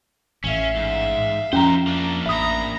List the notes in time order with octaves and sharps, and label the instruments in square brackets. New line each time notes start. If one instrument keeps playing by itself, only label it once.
[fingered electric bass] A1 A2 [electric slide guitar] C#4 [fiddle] E5 F5
[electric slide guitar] G#2
[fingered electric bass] F2 F3 [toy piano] C#4 G5 A#5 [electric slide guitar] D#4 C5
[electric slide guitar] A#3 D4
[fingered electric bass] A1 [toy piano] E5 D#6 [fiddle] A#5 B5